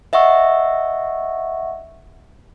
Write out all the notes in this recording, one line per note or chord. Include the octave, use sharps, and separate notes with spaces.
D#5 E5 F#5 C#6 E6